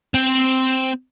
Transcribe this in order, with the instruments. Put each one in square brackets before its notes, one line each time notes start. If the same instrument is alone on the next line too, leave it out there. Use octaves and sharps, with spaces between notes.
[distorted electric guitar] C4